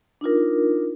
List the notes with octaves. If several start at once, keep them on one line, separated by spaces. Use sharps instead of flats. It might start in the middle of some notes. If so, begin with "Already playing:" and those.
D4 D#4 F4 A#4